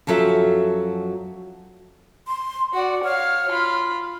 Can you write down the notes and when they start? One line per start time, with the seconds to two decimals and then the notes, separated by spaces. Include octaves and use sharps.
0.07 F#2 F3 F#3 A4 E5
2.27 C6
2.74 F#4 D5 F#5
3.04 C#5 F5 F6
3.50 F4 B5